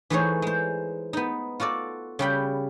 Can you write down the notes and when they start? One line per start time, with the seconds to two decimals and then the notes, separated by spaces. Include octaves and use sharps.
0.10 E3 A3 D#4 G#4 C5 C#5
0.42 G#3 C5
1.13 B3 D#4
1.60 F4 F#4 A4 D5
2.19 C#3 G3 G5 B5